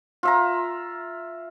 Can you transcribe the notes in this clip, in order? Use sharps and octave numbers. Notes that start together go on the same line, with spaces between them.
F4 E5 A#5